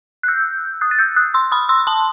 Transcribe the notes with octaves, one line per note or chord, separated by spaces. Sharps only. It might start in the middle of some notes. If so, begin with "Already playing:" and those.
F#6
E6 G6
D#6 F#6
A6
E6 G6
D#6 F#6
C6 E6
B5 D#6
C6 E6
A5 C6